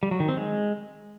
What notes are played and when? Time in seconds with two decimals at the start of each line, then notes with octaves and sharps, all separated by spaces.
0.03 G3
0.11 F#3
0.20 D#3
0.29 C4
0.37 G#3